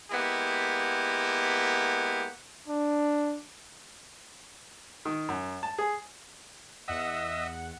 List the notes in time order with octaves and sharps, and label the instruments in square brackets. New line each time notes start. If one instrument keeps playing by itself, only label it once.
[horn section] G#3 A#3 B3 E4 G4
[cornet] D4
[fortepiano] D#3
F#2
A5
G#4
[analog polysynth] E2 F#5 [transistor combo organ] D#5 E5